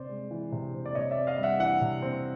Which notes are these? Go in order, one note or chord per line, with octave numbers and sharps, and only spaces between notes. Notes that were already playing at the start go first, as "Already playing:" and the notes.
Already playing: C3 C4 C5 D5
G#3
E3
C3
C4
D5
C3 C#5 D#5
D5 E5
C4
D#5 F5
G3
E5 F#5
E3 E5 F#5
C3
C4